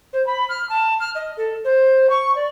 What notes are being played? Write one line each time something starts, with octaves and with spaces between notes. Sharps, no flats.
C5
B5
F6
A5
F6
D#5
A4
C5
C#6
D5